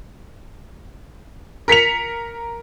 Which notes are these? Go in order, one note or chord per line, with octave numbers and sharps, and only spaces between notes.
A#4 B6 C#7 F7